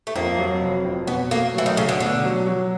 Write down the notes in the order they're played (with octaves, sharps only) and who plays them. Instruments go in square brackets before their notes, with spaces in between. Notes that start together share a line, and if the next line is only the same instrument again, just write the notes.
[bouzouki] A3
[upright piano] F2 [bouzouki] A#3
[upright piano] F#3
F1
F2
[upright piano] B2 [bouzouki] B3
[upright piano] A3 [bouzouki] A#3
[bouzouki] E3 [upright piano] F#3
[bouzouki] D#3
[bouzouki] C#3 [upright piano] A3
[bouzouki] D3
[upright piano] B2 [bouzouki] D3
[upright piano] F#3
F#3